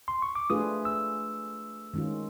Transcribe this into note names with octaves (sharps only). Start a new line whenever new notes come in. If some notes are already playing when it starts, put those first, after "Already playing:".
C6
C#6
D6
A3 D4 F4 G#4 B4 D#6
E6
D#3 G#3 C#4 F4